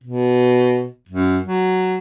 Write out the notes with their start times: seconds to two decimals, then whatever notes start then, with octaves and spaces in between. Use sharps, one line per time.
0.03 B2
1.09 F#2
1.45 F#3